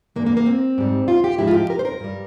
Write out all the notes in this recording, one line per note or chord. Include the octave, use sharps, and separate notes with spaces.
G2 E3 G#3 A#3
A#3
A#3
C4
G#2 G3
F4
G4
G#2 F3 G#3 E4
F4
G4
A#4
C5
A#4
G2 G3